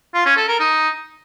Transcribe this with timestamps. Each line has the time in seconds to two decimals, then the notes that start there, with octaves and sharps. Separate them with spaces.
0.14 F4
0.26 C#4
0.37 A4
0.48 A#4
0.60 D#4